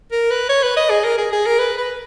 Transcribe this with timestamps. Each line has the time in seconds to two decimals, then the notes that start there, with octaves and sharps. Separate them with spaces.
0.12 A#4
0.31 B4
0.49 C#5
0.63 B4
0.77 D#5
0.90 G#4
1.04 A#4
1.18 G#4
1.32 G#4
1.46 A#4
1.59 B4
1.78 B4